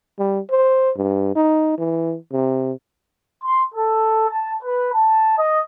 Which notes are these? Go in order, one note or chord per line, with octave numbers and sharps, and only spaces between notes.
G3
C5
G2
D#4
E3
C3
C6
A4
A5
B4
A5
D#5